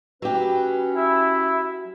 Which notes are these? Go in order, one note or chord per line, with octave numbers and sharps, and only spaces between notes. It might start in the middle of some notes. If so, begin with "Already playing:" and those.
F#3 C#4 G4 B4
E4 E5